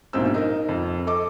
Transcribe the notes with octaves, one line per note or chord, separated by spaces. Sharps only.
A#1 G#2 B2 A#3 C4 E6
D#4 A#4 D#5
F2
A4 D#5 D6